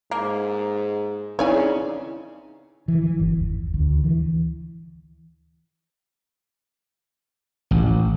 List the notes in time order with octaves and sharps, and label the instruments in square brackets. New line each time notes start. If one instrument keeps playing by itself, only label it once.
[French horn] G#2 [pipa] A#3
[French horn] C#3 [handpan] C4 D#4 E4 [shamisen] C#5 D5 G#5
[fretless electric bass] E3
E3
G1
D#2
D2
E3
[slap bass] A1